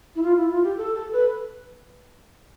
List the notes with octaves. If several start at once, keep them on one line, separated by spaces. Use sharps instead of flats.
E4
F4
E4
F4
G4
A4
A4
B4